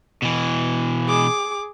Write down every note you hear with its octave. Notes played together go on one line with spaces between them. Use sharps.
B2 E3
G#4 D6